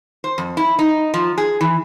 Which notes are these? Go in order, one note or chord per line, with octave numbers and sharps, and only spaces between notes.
C5
F2
E4
D#4
F3
G#4
E3